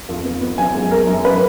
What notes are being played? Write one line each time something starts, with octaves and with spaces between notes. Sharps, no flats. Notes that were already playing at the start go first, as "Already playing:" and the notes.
F2
B3
B3
F#2 G#5
G#3
G#3 A#4
F#2
B4